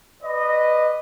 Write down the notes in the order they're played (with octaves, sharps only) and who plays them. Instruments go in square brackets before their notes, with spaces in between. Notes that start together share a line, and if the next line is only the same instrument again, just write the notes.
[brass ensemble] B4 D5 D#5